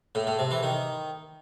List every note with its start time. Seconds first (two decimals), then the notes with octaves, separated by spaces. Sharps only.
0.15 A2
0.27 A2
0.39 C3
0.51 E3
0.63 D#3